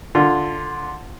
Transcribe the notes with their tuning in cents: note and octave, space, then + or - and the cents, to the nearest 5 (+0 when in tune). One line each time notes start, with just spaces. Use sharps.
D3 +0 F4 +0